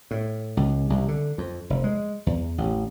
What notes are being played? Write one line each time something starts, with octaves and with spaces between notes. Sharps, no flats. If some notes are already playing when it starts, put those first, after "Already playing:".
A2
C#2
C2
D3
F2
F1
G#3
E2
A1